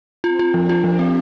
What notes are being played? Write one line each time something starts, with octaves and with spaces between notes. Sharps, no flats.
C4 F4
F4
F3 D4
F4
F3 G4
C4